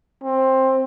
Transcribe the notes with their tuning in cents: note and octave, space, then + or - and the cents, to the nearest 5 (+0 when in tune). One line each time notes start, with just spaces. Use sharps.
C4 +15